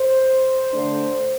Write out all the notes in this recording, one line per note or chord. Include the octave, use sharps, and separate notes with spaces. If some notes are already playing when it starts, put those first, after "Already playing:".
Already playing: C5
D3 A3 D4